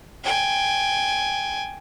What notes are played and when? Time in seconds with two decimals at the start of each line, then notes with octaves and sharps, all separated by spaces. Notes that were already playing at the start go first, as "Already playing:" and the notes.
0.24 G5 G#5